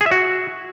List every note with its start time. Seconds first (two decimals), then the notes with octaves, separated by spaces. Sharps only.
0.01 G#4
0.06 E5
0.11 F#4